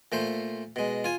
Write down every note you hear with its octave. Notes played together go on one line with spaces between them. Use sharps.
A#2 A3 C5
B2 G#3
F4 G#5